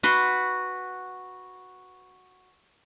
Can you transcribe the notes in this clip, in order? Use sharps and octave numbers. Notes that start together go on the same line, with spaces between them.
F#4 B4 C6